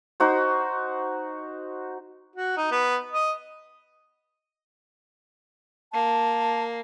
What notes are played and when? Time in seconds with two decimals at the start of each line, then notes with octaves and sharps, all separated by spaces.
0.20 D#4 F#4 C5
2.36 F#4
2.57 D#4
2.71 B3
3.12 D#5
5.93 A#3 A5